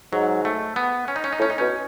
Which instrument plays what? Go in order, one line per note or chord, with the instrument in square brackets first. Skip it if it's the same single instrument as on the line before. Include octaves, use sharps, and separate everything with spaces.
[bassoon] G#2 [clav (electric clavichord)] F#3
[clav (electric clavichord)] A3
B3
C#4
D#4
C#4
D#4
[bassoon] A2 [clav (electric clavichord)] C#4
[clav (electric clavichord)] D#4
[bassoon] B2 [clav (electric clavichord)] C#4